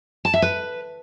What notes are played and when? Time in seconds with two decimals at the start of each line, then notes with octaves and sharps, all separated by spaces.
0.25 A5
0.34 E5
0.42 B4